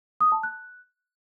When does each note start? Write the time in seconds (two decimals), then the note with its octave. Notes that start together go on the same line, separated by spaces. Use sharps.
0.21 D#6
0.32 A5
0.43 F#6